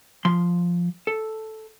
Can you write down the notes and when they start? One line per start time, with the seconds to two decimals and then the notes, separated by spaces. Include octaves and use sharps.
0.25 F3 C6
1.07 A4